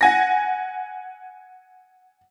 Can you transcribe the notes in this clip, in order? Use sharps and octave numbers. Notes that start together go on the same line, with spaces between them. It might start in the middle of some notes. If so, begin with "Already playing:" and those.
F#5 G#5 A#6